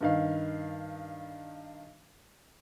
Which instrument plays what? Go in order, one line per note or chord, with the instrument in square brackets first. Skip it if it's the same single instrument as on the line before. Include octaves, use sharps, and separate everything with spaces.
[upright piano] G2 D#3 F5